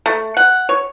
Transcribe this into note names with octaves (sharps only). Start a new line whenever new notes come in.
A3
F#5
C#5